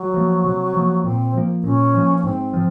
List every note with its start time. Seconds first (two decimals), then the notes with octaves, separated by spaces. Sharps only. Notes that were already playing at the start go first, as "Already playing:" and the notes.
Already playing: F#3
0.14 F3 A#3
0.44 C3
0.73 F3 A#3
1.03 A#2 C4
1.34 F3 A#3
1.64 A#2 C#4
1.94 F3 A#3
2.18 C#4
2.24 G#2 C4
2.53 F3